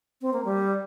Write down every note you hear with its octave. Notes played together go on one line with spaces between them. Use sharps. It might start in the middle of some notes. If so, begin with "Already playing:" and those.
C4
A#3
G3